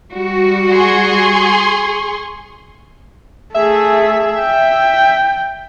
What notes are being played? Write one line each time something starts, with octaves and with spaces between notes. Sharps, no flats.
G3 F#4
G#4 C6 C#6
A3 G#4 E5
G5